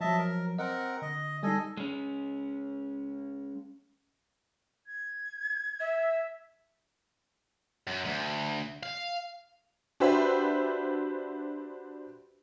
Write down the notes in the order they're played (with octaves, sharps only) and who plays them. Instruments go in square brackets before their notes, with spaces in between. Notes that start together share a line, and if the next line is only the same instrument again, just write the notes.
[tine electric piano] F3 F#3 [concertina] D#5 E5 A5
[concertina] A#4
[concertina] C4 A#4 F#5 [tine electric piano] D#5
[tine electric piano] D3 [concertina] D#5
[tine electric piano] G3 G#3 D#4 [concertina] A4 D#5 G#5
[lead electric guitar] G#3 C#4
[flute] G#6
[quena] E5
[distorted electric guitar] F#2
D2
F5
[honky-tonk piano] D4 F#4 G4 B4 C5 E5